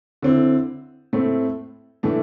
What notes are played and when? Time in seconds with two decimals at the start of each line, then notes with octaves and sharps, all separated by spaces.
0.22 D3 C4 E4
1.13 A2 A3 C4
2.03 A2 E3 A3 D4